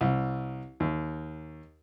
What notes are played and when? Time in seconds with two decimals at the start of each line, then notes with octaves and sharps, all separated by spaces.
0.01 C2
0.80 D#2